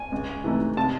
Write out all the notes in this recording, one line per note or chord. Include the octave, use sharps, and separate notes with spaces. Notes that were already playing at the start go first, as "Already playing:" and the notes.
Already playing: G#5
C#2
C3 E3 A3 D#4
C3 A5